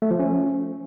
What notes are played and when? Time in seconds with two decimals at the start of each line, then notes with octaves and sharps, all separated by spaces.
0.02 A3
0.11 F3
0.19 C#4